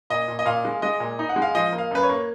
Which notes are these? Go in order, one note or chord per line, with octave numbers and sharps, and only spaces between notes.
A#2 D#5
A#2
D#5
A#2 F5
G#3
G#3 D#5
A#2
D#4
F#5
G#3
F5
F3 D#5
A#3
F5
F#2 B4
C#5
A#3